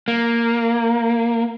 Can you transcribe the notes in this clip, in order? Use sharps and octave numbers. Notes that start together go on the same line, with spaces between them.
A#3